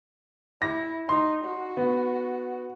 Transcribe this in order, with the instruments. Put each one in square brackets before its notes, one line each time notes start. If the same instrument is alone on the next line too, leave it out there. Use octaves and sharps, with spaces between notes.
[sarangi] E4 [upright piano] A#6
[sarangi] D#4 [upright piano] C6
[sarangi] F#4
[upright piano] B3